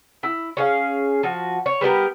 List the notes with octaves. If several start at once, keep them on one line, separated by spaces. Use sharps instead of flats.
E4
C#4 G#4 F5
F3 F#4
C#5
G3 B3 G4 A#4